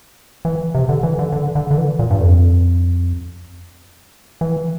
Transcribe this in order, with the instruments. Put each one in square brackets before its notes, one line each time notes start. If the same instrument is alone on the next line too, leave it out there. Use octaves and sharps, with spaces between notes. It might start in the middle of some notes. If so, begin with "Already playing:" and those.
[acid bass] E3
C3
D3
E3
D3
D3
D3
D3
E3
A#2
G2
F2
E3